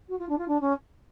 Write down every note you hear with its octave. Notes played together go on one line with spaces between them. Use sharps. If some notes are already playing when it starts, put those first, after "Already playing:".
F#4
F4
D4
F4
D4
C#4